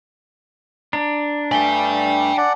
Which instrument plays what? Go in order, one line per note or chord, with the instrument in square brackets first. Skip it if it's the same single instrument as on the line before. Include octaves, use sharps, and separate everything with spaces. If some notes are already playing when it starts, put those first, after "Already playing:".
[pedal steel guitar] D4 [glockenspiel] A#5
[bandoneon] G2 A3 [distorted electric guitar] D5 G5 [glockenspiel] G#5 B6 G7
[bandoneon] D5 F#5 [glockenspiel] A5